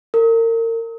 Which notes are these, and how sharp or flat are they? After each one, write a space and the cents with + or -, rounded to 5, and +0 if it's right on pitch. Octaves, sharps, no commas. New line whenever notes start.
A#4 -35